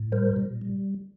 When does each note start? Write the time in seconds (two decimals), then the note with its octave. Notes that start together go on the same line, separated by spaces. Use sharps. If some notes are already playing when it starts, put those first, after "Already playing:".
Already playing: A2
0.12 G3 A#4 C5
0.36 A#2
0.61 G3